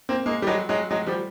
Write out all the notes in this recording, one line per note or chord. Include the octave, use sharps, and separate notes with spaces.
A#3 C4
G#3 A#3
G3
F#3 G#3
F#3 G#3
F#3 G#3
F3 G3